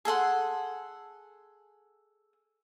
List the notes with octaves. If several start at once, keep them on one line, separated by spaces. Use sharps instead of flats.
G#4 A4 F#5 C6